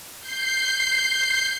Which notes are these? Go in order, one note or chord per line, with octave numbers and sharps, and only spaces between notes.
G6 C7